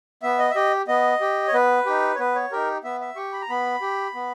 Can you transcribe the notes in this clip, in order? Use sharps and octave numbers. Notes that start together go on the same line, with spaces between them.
B3 E5
D#5
E5
G4 D#5
B3 D#5
G4
C#5
B3 B4
D#4 G4
C#5
B3 B4
C#5
D#4 G4 A#4
B3 E5
E5
G4 C#6
B5
A#5
B3 B5
G4
B3